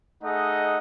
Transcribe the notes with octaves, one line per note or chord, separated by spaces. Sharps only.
A3 D#4 G#4 D#5 F#5